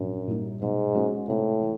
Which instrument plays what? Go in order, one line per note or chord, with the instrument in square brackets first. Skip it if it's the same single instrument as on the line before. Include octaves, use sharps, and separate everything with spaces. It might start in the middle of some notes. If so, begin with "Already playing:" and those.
Already playing: [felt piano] A#1 [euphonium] F#2
[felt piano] A#2 G3 A#3 D#4
[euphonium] G#2 [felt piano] B2
[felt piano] G#3 C#4 F#4
[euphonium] A2 [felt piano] C3
[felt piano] E3